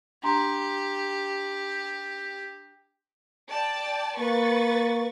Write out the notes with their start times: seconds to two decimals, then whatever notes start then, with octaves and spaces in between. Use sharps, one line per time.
0.23 D4 G4 A#5 C6
3.50 D5 G5 A5
4.19 A#3 B4 C#6 A6